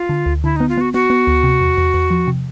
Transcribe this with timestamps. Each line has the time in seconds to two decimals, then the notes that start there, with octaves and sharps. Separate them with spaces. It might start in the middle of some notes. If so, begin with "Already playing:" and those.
Already playing: F4
0.09 D3
0.26 D2
0.43 D3 E4
0.56 B3 D#4
0.69 F4
0.78 B3 F#4
0.93 B3 F#4
1.10 B3
1.27 D2
1.44 C3
1.61 E2
1.77 E2
1.94 E2
2.11 F3
2.27 C3